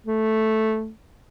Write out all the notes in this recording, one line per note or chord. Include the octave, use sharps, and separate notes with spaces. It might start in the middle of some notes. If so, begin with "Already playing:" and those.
A3